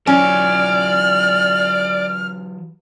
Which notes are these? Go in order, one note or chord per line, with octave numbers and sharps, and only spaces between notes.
E3 F#3 C#4 D5 F6